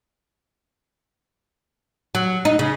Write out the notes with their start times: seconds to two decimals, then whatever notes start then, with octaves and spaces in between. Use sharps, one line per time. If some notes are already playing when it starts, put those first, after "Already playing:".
2.15 F#3
2.45 D#4
2.59 C#3